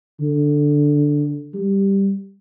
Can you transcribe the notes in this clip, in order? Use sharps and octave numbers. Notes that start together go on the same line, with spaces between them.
D3
G3